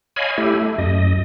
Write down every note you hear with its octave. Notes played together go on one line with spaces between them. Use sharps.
C#5 D#5 F5 G#5 B5
A3 E4 G4
A3
F#2 D#5